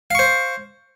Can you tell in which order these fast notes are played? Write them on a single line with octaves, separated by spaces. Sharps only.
F5 C#6 C5